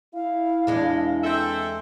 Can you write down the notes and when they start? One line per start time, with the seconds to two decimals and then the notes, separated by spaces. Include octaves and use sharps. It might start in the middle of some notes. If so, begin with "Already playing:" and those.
0.14 E4 F5
0.67 E2 G#3 D4
1.24 C4 A4 E5